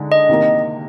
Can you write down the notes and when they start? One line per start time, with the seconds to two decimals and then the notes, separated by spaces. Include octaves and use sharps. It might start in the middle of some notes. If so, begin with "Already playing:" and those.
Already playing: D3 G#3 D#4
0.12 D#5
0.29 C3 D#3 A#3